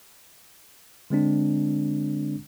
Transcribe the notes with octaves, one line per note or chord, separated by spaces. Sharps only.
D3 G#3 C4 D4